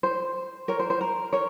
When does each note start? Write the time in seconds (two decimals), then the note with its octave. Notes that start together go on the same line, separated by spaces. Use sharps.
0.03 C5
0.68 A#4 C#5
0.79 C5
0.90 C5
1.01 A#4
1.33 A#4 C#5